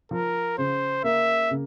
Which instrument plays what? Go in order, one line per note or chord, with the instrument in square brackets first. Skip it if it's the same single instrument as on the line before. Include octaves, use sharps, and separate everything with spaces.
[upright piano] F3 [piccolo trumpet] A#4
[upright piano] C#3 [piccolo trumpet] C5
[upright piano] A#3 [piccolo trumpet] E5
[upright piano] C#3